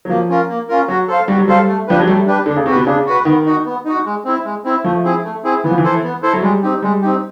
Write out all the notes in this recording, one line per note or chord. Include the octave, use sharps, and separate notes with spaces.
F#3
F3 A#3
C#4 F4 A#4
A#3
C#4 F4 A#4
F#3 F#4
A4 C5 F5
G3 F#4
F#3
G3 A4 C5 F5
A3
F3 D4 G4 B4
F#3
G3 A3
D4 G4 B4
D3 D4
C#3
C3 F#4 B4
B2
C#3 D4
F#4 B4
D#3 B3
D#4 F#4
B3
D#4 F#4
G#3
C4 E4
G#3
C4 E4
F3 A3
C4 E4 G#4
A3
C4 E4 G#4
E3 B3
F3
E3
E4 A4 C5
B3
E4 A4 C5
F#3
G3 G#3
C4 D#4 G4
G3 G#3
C4 D#4 G4